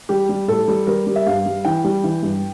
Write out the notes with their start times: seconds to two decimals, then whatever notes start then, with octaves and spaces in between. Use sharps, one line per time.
0.09 G3 G4
0.29 G3
0.48 A2 A4
0.68 G3
0.87 G3 A#4
1.07 G3
1.16 E5
1.27 G2 F5
1.46 G3
1.65 E3 G5
1.84 G3
2.04 E3
2.23 G2